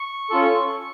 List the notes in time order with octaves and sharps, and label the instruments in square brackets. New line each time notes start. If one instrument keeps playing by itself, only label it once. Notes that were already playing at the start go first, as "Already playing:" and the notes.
Already playing: [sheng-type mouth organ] C#6
C#4 F4 A4